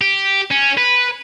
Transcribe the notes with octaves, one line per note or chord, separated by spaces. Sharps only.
G4
C#4
B4